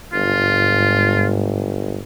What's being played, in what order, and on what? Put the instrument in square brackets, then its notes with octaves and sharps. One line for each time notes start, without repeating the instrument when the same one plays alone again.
[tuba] G1 [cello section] G#2 [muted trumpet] F4